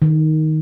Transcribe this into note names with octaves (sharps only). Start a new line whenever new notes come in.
D#3